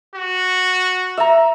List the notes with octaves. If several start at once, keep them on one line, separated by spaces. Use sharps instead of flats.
F#4
E5 A#5